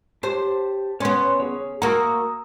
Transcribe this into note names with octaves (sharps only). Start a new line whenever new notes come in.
G4 C5 A5 G6
B3 C#4 C#5 C6 F#6
G#4 C#5
A#3 F#4 A#5 D#6 E6